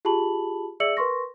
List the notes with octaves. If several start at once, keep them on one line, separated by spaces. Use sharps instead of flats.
F4 G4 G#4 A5 B5 F#7
G#4 D5 E5 E6 C#7 F#7
A#4 B4 C6 C#6 A#6